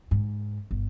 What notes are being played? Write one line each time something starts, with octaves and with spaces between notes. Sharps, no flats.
G#2
G1